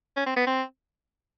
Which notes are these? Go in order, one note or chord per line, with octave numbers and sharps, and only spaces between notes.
C#4
C4
B3
C4